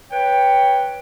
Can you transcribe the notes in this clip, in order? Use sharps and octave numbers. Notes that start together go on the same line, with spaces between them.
B4 C#5 G5